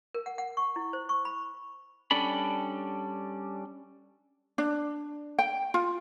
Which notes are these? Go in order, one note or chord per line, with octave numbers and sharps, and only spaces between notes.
A#4
F#5
F#5
C#6
E4
C5
C#6
B5
G3 C#4 D4 A4 B5
D4
G5
F4